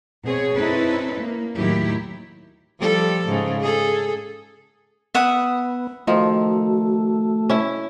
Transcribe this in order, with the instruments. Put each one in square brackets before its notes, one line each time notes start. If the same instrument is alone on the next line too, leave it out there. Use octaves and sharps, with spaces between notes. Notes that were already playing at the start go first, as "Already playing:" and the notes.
[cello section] B2 C4 G#4 C#5
C4 C#4 D#4 E4 A4 B4
A#3
D#2 A2 D#3 F#3 E4 G4
[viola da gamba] F3 G3 A4
G#2 C#3
G#4 A4
[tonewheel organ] B3 [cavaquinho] E5 F#5 D#6
[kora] D#3 F3 [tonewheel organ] A3 [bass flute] F#4
[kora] C#4 E4